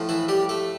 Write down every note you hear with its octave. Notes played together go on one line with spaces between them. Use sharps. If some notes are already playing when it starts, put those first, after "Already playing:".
Already playing: A2 F3
E3 E4
G3 G4
A3 A4